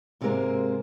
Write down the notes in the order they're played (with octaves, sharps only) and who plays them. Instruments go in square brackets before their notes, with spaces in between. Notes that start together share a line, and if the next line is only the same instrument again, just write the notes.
[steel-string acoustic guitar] G#2 C3 G#3 A#3 A#4 C5